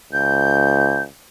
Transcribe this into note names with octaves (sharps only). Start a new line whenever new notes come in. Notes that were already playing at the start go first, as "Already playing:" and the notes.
C#2 G6